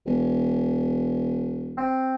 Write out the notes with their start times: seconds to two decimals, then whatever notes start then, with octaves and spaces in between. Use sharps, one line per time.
0.06 E1
1.78 C4